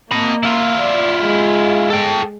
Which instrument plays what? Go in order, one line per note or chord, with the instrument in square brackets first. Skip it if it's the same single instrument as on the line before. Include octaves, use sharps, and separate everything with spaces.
[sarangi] A#3 [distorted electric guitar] D#5 B5
[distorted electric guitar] E4 F4
[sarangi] D5
G#3
[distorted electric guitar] A4 G5